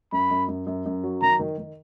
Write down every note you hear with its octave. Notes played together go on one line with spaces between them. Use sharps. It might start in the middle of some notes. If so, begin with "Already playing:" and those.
F#2 B5
F#2
F#2
F#2
F#2
F#3
D#3 A#5
D#3
D#3